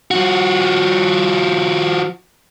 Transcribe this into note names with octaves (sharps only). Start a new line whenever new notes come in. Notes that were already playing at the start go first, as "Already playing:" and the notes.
F3 F#4